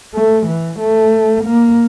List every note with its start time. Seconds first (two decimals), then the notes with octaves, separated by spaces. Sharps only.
0.15 A3
0.47 E3
0.80 A3
1.44 A#3